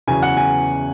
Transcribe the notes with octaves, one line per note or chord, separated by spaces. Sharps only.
E2 C#3 F#3 B3 G#5
F#5
G#5